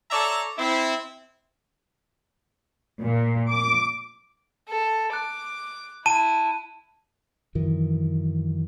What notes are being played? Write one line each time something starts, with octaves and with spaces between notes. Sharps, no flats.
A4 C#5 D5 E5 A5 A#5
C4 E4
A#2
D6
A4
D6 F#6
E4 A5 D#7
F#2 D#3 E3